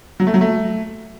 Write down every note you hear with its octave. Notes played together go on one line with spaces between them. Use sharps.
F#3
A3
F#3
A3